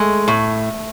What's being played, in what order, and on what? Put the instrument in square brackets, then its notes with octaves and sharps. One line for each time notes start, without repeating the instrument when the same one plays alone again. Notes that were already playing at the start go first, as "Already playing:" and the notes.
Already playing: [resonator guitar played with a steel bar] G#3 A3
A2